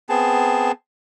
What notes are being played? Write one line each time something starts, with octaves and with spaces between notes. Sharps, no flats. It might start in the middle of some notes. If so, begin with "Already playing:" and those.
B3 C4 G#4 A5